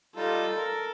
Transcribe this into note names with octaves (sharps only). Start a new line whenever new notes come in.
G3 D#4 F4 A4
A#4